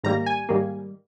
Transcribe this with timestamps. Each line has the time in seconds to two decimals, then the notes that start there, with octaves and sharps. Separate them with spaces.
0.04 G#2 D#3 G3 A#3 A#5
0.26 G#5
0.49 G#2 D#3 G3 A#3